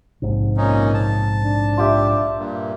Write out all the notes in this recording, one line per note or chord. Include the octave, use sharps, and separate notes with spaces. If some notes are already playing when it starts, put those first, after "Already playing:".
A#1 G#2 C3
A#2 C#4 D#4
A5
D4
F4 G4 E5
G2 A#2